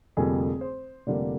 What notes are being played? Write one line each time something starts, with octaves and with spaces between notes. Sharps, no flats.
F1 F2 D3 G3 A#3 G#4
C5
F1 F2 D3 G3 A#3 D5